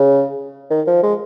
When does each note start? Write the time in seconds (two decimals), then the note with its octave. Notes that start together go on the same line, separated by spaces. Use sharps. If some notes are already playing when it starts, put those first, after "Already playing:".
Already playing: C#3
0.71 D#3
0.87 F3
1.03 G#3